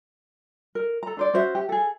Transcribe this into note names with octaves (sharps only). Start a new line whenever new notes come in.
A#4
A4 A#5
D4 C5 D5
C#4 F#4 C5 E5
G4
G#4 A4